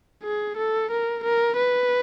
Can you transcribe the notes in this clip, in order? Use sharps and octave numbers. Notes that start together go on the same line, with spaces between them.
G#4
A4
A#4
A#4
B4